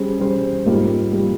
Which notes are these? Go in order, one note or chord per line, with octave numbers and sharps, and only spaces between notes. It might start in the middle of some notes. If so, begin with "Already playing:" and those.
Already playing: G3 C#4 G#4 C5
G3 C#4 G#4 C5
G#2 G3 A#3 F4
G3 A#3 F4